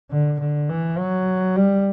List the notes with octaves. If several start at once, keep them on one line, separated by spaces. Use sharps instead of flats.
D3
D3
E3
F#3
G3